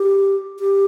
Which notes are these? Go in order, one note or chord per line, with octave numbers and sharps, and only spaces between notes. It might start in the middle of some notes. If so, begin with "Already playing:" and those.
Already playing: G4
G4